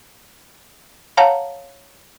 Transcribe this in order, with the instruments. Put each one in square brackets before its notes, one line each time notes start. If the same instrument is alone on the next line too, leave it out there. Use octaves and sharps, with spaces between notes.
[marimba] C#5 F5 F#5 A5 A#5